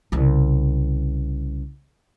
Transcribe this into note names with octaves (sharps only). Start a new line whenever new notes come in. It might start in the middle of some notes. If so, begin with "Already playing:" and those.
C2 C#3